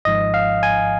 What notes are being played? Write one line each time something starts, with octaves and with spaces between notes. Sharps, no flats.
G#1 G#2 F3 D#5
F5
G#5